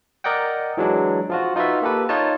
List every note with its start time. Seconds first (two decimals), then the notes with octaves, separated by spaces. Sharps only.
0.24 A#4 D5 D#5 F#5 G5
0.77 E3 F#3 G#3 D4
1.30 F3 F4 F#4
1.56 D#4 F4 F#4 B4 E5
1.82 A#3 G4 A4 B4
2.09 D#4 F4 C#5 A5